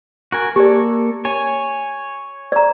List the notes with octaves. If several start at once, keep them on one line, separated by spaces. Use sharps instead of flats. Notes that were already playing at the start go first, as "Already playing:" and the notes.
F#4 A#4 G#5
A#3 G4 A4 D5
C#5 G#5
D5 A#5